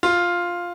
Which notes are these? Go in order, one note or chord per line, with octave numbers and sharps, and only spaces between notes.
F4